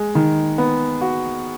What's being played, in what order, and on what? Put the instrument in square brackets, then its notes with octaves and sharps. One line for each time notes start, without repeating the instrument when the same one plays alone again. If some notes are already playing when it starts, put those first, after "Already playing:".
Already playing: [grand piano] G#3
D#3
B3
F#4